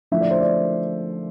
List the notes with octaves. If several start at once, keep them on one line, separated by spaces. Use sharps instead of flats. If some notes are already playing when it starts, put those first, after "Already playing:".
D3 F3 A3 E4 E5
D5
C5
D5